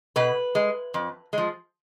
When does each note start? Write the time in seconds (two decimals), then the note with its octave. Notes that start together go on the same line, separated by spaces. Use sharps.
0.16 B2 B4
0.55 G#3
0.94 F2
1.33 F3 G#3